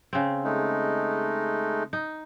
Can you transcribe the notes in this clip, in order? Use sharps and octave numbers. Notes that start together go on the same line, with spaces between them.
C#3 C4
G#3 A3 D#4
D#4